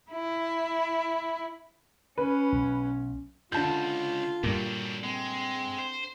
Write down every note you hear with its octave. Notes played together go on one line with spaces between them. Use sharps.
E4
C#4 B4
B1
C#2 D3 F4 A5 G6
G2 A#2 F#3 G3
G#3 C4
C5